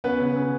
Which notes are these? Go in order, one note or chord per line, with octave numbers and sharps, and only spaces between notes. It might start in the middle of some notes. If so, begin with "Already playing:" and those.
B3 C#4 B4
C#3
C#3